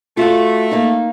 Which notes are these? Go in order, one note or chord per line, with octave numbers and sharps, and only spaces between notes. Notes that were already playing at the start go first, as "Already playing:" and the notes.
A3 F4 F#4
A#3 D#4